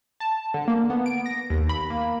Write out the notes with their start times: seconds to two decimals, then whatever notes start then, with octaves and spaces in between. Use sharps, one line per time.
0.20 A5
0.54 D3
0.68 A#3
0.90 B3
1.06 D7
1.26 A#6
1.50 D#2
1.69 B5
1.90 A#3